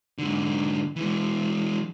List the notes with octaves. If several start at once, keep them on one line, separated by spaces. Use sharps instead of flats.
G#2 D3
E3 G#3